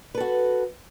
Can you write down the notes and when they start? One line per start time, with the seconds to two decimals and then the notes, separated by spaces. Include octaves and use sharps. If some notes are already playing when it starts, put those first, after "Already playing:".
0.15 B4
0.17 A4
0.20 F#4